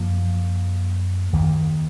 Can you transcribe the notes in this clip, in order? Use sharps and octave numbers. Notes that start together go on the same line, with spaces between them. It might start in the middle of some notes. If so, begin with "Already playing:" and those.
Already playing: F#2 F3 A#3
D#2 D#3 A#3